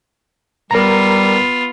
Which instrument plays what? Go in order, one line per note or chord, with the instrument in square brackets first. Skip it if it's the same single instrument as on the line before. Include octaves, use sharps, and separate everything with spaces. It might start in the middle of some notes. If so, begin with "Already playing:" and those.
[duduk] G3 [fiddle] B3 F4 [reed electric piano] A#4 A#5